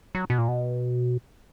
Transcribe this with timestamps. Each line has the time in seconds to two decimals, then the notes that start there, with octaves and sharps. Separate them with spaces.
0.15 F#3
0.30 B2
0.38 A#2
0.48 B2